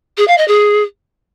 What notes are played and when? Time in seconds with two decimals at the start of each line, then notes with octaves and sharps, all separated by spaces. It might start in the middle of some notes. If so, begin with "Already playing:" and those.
0.18 G#4
0.28 F5
0.38 D#5
0.48 G#4